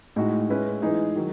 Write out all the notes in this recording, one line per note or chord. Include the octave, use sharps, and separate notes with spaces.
A2 G#3 D#4 F#4
A2 G#3 C#4 E4 B4
E3 G#3 D#4 G#4
D#3 F#3